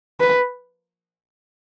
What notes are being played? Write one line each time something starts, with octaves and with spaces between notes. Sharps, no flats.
B4